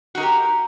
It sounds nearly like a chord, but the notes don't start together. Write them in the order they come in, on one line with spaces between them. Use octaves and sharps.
F#4 D#4 A#4 G4